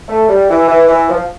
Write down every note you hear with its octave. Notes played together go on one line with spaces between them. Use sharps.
A3
G3
E3
E3
E3
F3